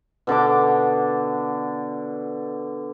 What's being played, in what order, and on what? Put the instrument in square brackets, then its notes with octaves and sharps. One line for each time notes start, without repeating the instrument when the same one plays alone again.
[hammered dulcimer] B2 D3 D4 D6